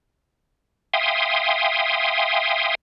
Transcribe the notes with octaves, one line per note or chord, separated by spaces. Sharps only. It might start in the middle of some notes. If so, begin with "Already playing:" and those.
E5 F5 G5 G#5 C6 D#6